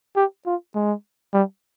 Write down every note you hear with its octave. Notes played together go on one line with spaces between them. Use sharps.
G4
F4
G#3
G3